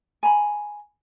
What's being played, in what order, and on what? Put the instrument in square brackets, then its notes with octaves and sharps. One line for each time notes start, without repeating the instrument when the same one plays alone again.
[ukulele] G#5 A#5 B5